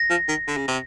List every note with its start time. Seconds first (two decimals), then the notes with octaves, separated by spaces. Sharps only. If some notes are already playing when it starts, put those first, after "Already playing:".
Already playing: A#6
0.10 F3
0.28 D#3
0.48 D3
0.57 C#3
0.68 C3